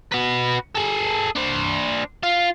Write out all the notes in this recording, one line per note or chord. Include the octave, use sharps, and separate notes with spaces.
F#4 B4
G#4 A4
D4 C5
F4